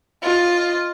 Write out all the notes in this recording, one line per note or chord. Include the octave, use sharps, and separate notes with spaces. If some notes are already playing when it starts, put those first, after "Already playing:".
F4 D#5